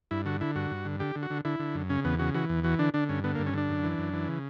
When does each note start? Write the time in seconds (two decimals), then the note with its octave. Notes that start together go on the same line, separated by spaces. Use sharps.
0.11 G2 E4
0.26 D3 F#4
0.41 D3 E4
0.55 G2 F#4
0.71 G2
0.85 D3
1.00 D3 G4
1.16 D3
1.23 F#4
1.30 D3
1.45 D3 E4
1.59 D3
1.75 F#2
1.90 C#3 C#4
2.05 E2 B3
2.19 C#3 F#4
2.34 E3 F#4
2.49 E2
2.64 E3 F#4
2.79 D3 D4
2.94 D3 D4
3.09 G2 C#4
3.24 D3 B3
3.35 A#3
3.39 G2
3.46 C#4
3.54 D3 D4
3.69 F#2
3.83 E3
3.99 F#2
4.13 E3
4.28 C#3